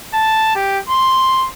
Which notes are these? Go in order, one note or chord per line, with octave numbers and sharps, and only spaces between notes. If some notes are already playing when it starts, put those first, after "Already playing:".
A5
G4
C6